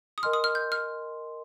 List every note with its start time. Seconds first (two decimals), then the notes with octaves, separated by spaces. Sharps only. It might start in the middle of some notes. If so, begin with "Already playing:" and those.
0.18 D#6
0.23 A#4 D#5 G#5 C6 F6
0.33 D#6
0.44 F6
0.55 G6
0.72 F6